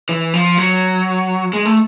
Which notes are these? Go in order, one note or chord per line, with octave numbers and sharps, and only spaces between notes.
E3
F3
F#3
G#3
A3